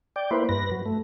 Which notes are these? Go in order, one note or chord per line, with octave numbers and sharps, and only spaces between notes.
D5 G5
A#3 E4 B4 C5
G2 B4 A#6
F#3
A3